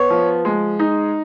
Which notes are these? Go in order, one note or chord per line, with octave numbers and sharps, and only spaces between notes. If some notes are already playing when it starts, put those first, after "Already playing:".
Already playing: B3 C#5
F3
G#3
D#4